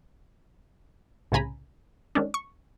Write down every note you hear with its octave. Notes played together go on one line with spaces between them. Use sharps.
C2 A2 C#3 G#5 A#5 B5
D#3 G#3 C#4 D4
C#6